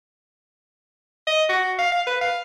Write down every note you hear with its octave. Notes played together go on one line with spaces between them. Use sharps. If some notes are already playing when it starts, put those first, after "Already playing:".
D#5
F#4
F5
F5
B4
F5